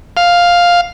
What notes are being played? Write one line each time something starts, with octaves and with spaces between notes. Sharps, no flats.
F5